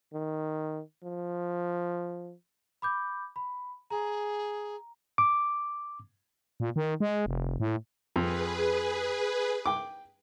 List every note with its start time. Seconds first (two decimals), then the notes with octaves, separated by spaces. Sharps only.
0.14 D#3
1.04 F3
2.82 B5 D6 G6
3.36 B5
3.90 G#4 A#5
5.18 D6
6.60 A#2
6.76 D#3
7.00 G#3
7.26 F1
7.60 A2
8.16 F2 G#4 B4
9.66 G5 D6